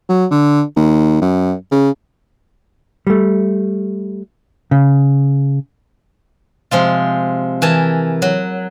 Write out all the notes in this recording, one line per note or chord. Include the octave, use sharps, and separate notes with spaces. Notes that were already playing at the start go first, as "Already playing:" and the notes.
F#3
D3
D#2
F#2
C#3
G3 A3
C#3
C3 F3 G#3 F4
E3 A#4 G#5 A5
F#3